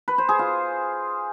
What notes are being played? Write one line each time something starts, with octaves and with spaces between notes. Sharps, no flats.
B4
C5
G#4
F4